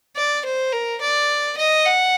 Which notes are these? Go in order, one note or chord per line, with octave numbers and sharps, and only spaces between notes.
D5
C5
A#4
D5
D#5
F#5